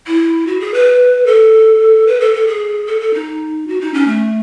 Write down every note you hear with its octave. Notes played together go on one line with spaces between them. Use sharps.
E4
F#4
G#4
B4
A4
B4
A4
A4
G#4
A4
A4
D#4
F#4
D#4
C#4
A3